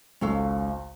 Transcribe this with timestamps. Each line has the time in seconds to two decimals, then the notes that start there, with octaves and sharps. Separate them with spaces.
0.21 G#1 C#2 C#4 A4 F5 C#6